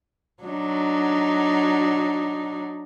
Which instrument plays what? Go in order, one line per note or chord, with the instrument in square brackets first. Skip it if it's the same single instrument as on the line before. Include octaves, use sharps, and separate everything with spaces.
[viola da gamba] F#3 D4 D#4